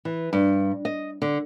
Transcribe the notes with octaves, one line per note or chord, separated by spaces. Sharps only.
E3
G2
D#5
D3